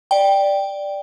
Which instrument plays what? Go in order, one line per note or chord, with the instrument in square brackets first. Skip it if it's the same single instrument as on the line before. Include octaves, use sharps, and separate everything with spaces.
[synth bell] D5 G5